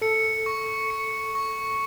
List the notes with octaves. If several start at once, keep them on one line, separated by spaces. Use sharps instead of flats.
A4 C#7
C#6
C#7
C#6